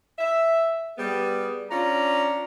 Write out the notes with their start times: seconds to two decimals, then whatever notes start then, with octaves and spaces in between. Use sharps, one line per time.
0.19 E5
0.98 G3 B3 G#4
1.70 C#4 D4 F4 A#5